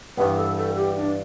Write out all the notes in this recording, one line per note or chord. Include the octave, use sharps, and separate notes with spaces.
G2 E3 G3 B3 B4
A4
A4
G4
D4